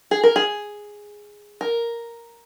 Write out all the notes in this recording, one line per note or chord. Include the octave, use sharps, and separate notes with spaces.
G#4
A#4
G#4
A#4